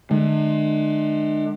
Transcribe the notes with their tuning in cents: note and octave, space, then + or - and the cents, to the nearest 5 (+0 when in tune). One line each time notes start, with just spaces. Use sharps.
D3 +45 G#3 +35